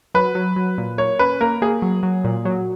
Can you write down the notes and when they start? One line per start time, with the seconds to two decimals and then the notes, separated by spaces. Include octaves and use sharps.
0.14 F#3 B4
0.35 F#3
0.56 F#3
0.78 A#2
0.98 A#3 C#5
1.19 C#4 B4
1.41 A#3 A#4
1.62 A#3 G#4
1.82 F#3
2.03 F#3
2.24 A#2
2.45 F#3